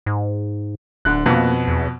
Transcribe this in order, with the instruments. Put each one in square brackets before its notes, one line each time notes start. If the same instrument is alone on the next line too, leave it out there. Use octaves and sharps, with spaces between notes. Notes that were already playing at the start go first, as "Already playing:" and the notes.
[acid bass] G#2
[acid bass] D1 [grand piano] D3 F#6
[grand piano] F2 B2 [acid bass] A#3
[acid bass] E2